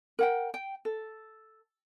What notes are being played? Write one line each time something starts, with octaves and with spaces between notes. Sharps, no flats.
A#4 F#5 G5
G5
A4